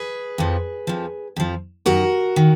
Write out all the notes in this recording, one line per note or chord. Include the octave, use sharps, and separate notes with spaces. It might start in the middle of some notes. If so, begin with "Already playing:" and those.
Already playing: G#4 B4
F2 F3
F2 F3
F2 F3
F#2 D#3 F#4 A#4
D#3